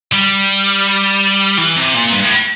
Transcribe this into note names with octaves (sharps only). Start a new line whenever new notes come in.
G3
E3
C3
A#2
G2
A2